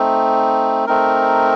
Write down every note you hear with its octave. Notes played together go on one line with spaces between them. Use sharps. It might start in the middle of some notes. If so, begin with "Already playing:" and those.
Already playing: A3 C4 D#4
A3 C4 D#4 A#4